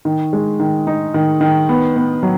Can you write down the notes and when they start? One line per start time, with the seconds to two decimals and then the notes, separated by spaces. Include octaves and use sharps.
0.05 D#3
0.33 G#3
0.60 D#3
0.87 D#4
1.14 D#3
1.41 D#3
1.69 B3
1.96 B3
2.23 F#3